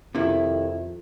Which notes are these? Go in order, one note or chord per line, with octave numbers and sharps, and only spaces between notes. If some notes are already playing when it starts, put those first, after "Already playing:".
F2 C3 D#3 E4